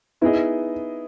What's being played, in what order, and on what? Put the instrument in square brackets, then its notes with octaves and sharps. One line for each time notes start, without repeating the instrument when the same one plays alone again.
[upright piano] B3 D#4 G#4 D#5 [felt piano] E4